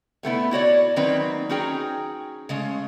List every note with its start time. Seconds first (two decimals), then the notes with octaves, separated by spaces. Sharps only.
0.23 C3 A3 B3 E4
0.51 E4 F#4 C#5 D5
0.96 D#3 F#3 A#3 C4 B4
1.49 C#4 D#4 F#4 G#4 G5 A#5
2.49 C#3 G#3 A3